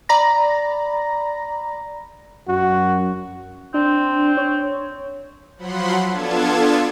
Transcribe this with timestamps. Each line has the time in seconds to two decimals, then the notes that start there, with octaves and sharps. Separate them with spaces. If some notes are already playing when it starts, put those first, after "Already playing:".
0.09 D5 A#5 B5 A#6
2.48 F#2 F#4
3.74 C4 D4
4.37 C#5
5.57 F3 F#3 F#5 B5 C6
6.11 B3 D4 F4 A4 A5 G#6